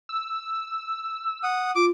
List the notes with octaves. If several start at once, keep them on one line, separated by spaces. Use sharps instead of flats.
E6
F#5 D#6
F4 D6